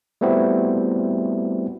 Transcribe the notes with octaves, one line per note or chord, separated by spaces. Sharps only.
G3 A3 B3 C4 E4 F#4